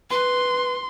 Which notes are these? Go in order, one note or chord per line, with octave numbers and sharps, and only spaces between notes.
B4 C6